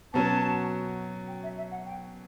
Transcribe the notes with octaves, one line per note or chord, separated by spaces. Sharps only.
B2 F#3 C#4 A5
G5
E5
E5
F#5
G5